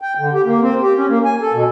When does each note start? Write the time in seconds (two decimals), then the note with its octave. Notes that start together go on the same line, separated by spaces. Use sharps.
0.02 G5
0.19 D3
0.33 G4
0.45 A#3
0.62 C4
0.82 G4
0.97 C#4
1.09 A#3
1.25 G#5
1.41 A4
1.53 B2